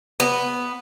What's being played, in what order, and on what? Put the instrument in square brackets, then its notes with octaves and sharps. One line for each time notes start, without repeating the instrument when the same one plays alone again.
[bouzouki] B3